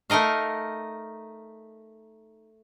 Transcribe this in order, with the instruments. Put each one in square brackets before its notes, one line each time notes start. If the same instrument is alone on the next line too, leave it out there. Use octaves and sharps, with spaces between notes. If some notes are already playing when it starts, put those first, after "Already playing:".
[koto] A3 D#4 A#4 D#5 F5